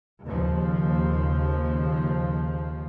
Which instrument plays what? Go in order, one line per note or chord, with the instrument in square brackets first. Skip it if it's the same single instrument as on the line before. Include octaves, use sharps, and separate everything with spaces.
[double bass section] D#2 C#3 F3